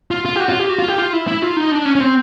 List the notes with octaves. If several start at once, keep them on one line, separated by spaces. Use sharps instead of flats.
F4
F4
G4
F#4
F4
G4
F#4
F4
G4
F4
E4
E4
F4
D#4
D4
C#4
C#4
C4